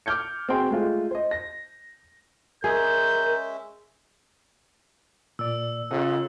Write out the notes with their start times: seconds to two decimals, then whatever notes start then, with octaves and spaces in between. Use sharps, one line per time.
0.06 D6 F6 G6 G#6 C#7
0.49 C4 F#4 G#4 G5 C6
0.71 G#3 A3 F4
1.11 C5 D#5
1.31 A#6
2.64 G#3 C#4 G#4 A#4 E5 G6
5.39 A#2 D5 E6
5.91 C#3 F4 A4 D#5 F#5